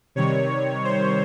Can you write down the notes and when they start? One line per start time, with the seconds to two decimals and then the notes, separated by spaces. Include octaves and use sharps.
0.15 C3 D#3 G3 C#5
0.84 C5